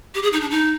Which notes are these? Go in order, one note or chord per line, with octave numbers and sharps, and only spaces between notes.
G4
G#4
D#4
D4
D#4